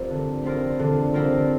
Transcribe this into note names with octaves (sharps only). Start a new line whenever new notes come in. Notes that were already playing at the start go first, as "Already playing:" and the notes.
Already playing: G3 C4 F4 A#4
D3
G3 C4 F4 A#4
D3
G3 C4 F4 A#4